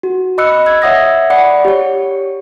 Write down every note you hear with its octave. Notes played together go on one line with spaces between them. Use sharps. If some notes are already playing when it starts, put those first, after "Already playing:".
F#4
D#5 B5 D6 E6 F#6 C#7
E6 G#6
C#5 E5 F#5 D#6 A#6
D5 F#5 B5 D6 C#7
G4 C#5